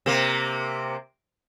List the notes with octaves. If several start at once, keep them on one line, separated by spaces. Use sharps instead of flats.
C3 A#3